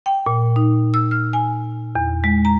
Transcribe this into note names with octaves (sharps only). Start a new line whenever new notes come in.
G5
A#2
D#4
E6
F6
G#5
E2
G#3
A#5